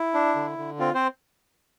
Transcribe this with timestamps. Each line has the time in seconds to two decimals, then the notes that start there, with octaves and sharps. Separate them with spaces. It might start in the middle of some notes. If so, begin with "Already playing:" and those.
Already playing: E4
0.14 D4
0.35 D3
0.58 D3
0.79 C4 F4
0.94 C4 C5